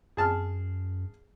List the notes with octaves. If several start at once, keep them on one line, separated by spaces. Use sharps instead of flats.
F#2 G#4 A5 F6